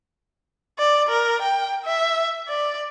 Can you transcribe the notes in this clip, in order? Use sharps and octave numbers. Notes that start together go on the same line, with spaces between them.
D5
A#4
G5
E5
D5